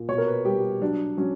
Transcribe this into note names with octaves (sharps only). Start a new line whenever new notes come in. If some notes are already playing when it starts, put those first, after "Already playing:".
Already playing: A#2
B2 C#5
A#4
B4
G3 G4
F#3 D4
F#3 C#4